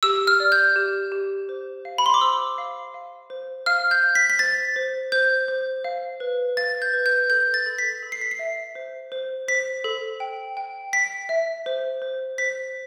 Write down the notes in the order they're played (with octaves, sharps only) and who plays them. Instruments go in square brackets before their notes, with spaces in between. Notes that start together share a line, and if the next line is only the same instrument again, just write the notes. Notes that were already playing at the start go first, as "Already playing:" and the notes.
[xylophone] G4 E6
F6
D5
G6
G4
G4
C5
F5
B5
C6
D6
C5 E6
F5
F5
C5
F5 F6
G6
F5
B6
B6
C5 A6
C5
C5 G6
C5
F5
B4
F5 A6
G6
B4
G6
A4 G6
A6
A4
B6
A4
C7
B6
C7
E5
C5
C5
C5 B6
A4
G5
G5
G5 B6
E5
C5
C5
C5 B6